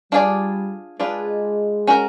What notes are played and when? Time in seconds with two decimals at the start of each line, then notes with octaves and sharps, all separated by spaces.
0.12 G3 D4 F4 G#4 B4 D5
1.00 G#3 D4 F4 G#4 B4 D5
1.87 C#4 F#4 A#4